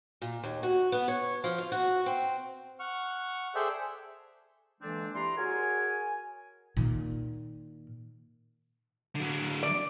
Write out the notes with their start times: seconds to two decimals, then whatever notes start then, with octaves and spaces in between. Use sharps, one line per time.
0.22 A#2
0.43 D#2
0.63 F#4
0.92 B3
1.08 C#5
1.44 F3
1.58 F4
1.72 F#4
2.06 C4
2.80 F#5 C#6 F6
3.55 G#4 A4 C5 D5 E5 G5
4.81 D3 E3 G#3 A#3 C4 D4
5.15 E4 G4 D5 A#5 C6
5.37 F#4 G#4 A#4 C#5 G#5
6.77 A#2 D#3
9.16 D3 F#3
9.63 D5